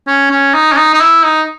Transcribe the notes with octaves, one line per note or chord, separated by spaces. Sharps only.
C#4
C#4
D#4
C#4
D#4
D#4
E4
D#4